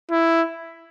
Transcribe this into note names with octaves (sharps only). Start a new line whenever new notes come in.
E4